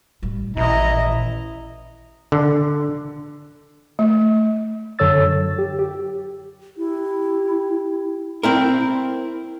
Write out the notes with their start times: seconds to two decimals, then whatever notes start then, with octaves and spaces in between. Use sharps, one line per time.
0.23 A1 G3
0.57 A1 A#2 D#3 E4 D#5 A#5
2.32 D3
3.99 A3
4.99 F#2 D3 A4 C#5 E6 A6
5.26 F#3
5.59 G4
5.79 G4
6.78 E4 G4
8.43 C4 E4 A#4